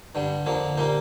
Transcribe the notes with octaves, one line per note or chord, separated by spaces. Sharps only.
G2 D3 G3
F2 D3 F3 A#3
A#2 G3 A#3 D#4